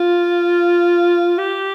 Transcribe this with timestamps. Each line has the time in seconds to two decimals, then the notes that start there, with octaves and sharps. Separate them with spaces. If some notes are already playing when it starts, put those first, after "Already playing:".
Already playing: F4
1.38 G4